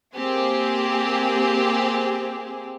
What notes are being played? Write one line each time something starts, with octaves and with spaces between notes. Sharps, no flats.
A#3 C4 G4 G#4